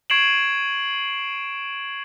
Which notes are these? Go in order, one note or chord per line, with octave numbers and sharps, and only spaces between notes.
C#6 G#6 C7 D7 E7 F#7